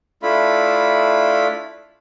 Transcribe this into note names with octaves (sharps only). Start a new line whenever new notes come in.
A3 D4 E4 F4 B5